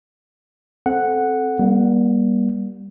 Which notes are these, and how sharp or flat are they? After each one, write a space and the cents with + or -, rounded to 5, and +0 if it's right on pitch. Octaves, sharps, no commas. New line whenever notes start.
C4 +0 A4 -10 F#5 +0
G3 +0 A#3 +45